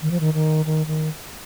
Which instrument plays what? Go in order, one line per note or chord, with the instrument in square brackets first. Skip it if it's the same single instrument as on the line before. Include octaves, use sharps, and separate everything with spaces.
[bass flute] D#3
F3
D#3
D#3
D#3
D#3